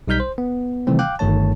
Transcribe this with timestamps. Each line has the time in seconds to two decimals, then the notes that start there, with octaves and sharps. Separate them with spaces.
0.07 B1 G3 D#4 F6 G6 B6
0.20 C5
0.38 B3
0.87 C3 D#3 E3 G3 A3 C4
0.99 F5 G5 D6 F#6
1.19 G1 G2 D#3 A3 C#5 A5